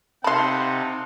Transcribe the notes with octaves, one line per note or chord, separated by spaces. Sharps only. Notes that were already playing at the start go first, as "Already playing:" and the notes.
C3 D#4 F5 F#5 A5 B5 C6